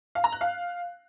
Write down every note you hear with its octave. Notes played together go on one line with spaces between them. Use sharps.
F5
A#5
F#6
F5